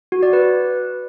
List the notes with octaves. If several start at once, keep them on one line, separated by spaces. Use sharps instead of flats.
F#4
D5
B4